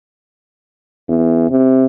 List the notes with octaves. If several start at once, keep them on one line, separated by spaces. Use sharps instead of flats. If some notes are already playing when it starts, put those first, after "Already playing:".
E2
C3